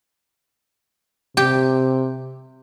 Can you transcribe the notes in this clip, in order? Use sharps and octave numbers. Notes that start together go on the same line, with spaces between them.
C3 G4